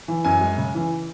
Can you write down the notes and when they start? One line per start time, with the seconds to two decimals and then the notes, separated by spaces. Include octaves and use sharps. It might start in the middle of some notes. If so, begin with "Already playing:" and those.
0.08 E3
0.25 F#2 G#5
0.41 G#3
0.57 C#3
0.75 E3